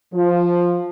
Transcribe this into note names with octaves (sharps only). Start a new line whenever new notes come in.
F3